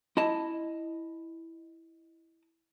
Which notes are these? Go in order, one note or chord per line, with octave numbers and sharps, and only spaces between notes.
E4 D#5 A5